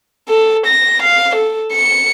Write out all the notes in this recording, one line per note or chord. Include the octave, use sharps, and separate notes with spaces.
A4
A#6
F5
A4
C#7